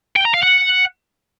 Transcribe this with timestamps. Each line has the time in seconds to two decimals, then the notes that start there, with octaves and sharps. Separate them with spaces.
0.16 G5
0.25 A#5
0.34 F5
0.43 F#5